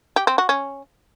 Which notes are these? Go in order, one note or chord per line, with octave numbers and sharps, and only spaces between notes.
G4
C4
F#4
C#4